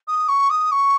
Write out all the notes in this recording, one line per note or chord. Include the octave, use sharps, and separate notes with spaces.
D#6
C#6
D#6
C#6